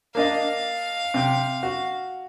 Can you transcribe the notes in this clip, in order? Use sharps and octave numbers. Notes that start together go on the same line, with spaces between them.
A#3 D4 D#5 F5
C3 G5
F#4